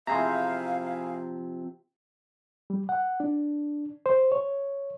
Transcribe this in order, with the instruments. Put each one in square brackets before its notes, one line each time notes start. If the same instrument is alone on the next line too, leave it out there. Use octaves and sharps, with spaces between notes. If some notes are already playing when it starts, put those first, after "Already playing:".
[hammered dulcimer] C3 F3 [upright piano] E4 G#4 E5 [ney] F5 [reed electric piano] A#5 C6
[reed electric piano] G3
F#5
D4
C5
C#5